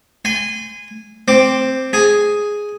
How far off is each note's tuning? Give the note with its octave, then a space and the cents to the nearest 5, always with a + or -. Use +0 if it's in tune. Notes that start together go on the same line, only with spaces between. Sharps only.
G#5 -15 C6 -35
C4 +0 D6 +0
G#4 +0 G#5 +0